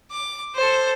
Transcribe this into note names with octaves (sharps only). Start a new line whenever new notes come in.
D6
A4 C5